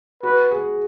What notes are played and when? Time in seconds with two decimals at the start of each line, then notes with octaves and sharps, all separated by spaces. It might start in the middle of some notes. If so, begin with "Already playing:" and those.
0.23 F#4 B4
0.51 G#4